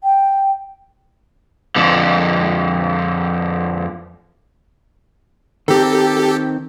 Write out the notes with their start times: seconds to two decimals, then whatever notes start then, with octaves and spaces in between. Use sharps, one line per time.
0.04 G5
1.76 F2 D3
5.68 D#3 C4 G4 A4